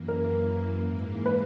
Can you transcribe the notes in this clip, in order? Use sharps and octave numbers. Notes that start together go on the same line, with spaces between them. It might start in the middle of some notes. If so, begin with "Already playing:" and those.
Already playing: F#2 E3 A#3
A#4
G#2 E3 A#3
B4